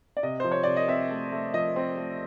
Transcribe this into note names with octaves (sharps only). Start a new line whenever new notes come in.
D5
C3 D#5
F3 C5
C#5
C3 D5
D#5
C4 E5
A3
A3
F3 D#5
C4
A3